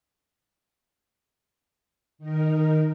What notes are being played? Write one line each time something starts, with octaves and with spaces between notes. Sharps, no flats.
D#3 D#4 A#4